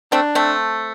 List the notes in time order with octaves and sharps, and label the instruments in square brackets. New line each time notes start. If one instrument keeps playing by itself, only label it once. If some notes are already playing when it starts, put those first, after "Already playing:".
[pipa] A3 C4 [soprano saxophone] D4
[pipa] A3 C4